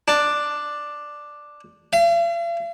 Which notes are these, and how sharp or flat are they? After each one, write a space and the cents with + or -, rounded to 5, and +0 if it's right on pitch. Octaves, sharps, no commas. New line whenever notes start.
D4 +5
F5 -45